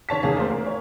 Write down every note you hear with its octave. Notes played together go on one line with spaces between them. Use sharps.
D#3 C#5 A5 B6
E2 D#3 A#3 G#4 F5
A3 A#3 C5
A#3
C#5